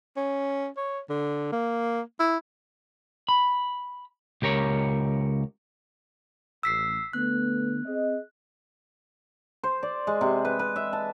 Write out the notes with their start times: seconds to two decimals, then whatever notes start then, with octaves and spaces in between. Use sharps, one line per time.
0.17 C#4
0.77 C#5
1.09 D3
1.52 A#3
2.19 E4
3.29 B5
4.42 C#2 G4 A#4 C#5
6.63 A1 E6 B6 C7
7.13 D3 A3 B3 F#6
7.85 C4 G#4 D#5
9.64 C5
9.83 D5
10.07 G#3
10.21 C3
10.45 B4
10.59 B4
10.76 E5
10.93 A5